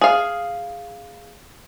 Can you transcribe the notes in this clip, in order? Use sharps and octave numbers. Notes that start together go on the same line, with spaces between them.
G#4 F5